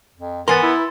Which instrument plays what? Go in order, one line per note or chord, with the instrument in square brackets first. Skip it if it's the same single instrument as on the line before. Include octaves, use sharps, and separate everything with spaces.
[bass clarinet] F2
[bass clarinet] E3 [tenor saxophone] B3 [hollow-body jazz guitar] A#4 G#5 [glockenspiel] C6 A6
[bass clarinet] E4